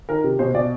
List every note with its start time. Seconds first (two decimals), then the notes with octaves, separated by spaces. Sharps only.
0.09 D#3 A#4
0.24 C3
0.39 B2 C5
0.54 B2 D5